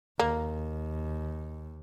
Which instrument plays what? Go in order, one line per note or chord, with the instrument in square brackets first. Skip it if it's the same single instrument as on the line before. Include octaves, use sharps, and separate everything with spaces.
[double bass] D#2 [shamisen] A#3